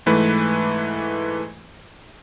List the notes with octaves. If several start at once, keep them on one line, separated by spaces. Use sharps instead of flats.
G#2 E3 A3 B4